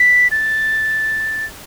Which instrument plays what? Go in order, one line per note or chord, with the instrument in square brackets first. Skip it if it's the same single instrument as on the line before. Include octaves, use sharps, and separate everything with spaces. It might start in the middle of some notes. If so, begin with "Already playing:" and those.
Already playing: [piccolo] B6
A6